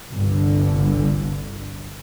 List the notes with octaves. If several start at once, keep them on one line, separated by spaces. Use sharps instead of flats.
G1 C2 D3